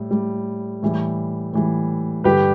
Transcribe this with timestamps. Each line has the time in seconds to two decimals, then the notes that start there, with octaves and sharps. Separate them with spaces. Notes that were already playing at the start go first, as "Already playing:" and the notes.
Already playing: A2 G3
0.11 A2 G3
0.83 A2 E3 G3
1.53 A2 E3 G3
2.24 G2 D3 G3 G4 B4